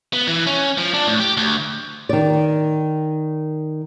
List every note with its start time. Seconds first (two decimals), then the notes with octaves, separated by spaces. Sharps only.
0.13 B3
0.28 E3
0.47 C#4
0.78 F3
0.94 D4
1.07 A2
1.19 G4
1.37 D2
2.09 D#3 D5